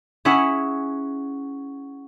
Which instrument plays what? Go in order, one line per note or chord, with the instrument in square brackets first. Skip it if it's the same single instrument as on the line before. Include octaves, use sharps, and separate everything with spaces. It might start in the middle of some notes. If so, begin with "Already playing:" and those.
[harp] C#4 E4 G#4 F#5